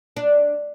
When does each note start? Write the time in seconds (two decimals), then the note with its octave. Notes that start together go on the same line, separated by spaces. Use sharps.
0.16 D4